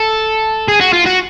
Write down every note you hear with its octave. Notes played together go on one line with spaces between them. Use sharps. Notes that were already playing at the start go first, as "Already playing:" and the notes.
Already playing: A4
G#4
F#4
F4
F#4